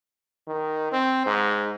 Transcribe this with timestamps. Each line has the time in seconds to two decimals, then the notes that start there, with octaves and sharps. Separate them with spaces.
0.48 D#3
0.92 C4
1.26 G#2